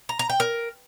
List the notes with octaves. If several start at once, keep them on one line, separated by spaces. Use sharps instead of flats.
A#5
A#5
G5
A#4